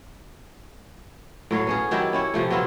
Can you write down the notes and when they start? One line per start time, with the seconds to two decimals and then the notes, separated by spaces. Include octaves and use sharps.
1.51 A2 F#3 C#5 F5
1.67 B3 C#4 G#4
1.91 D#3 F#3 E4 G4
2.13 C#4 E4 C#5
2.34 C3 F3 A3
2.50 F#3 B3 E4 F4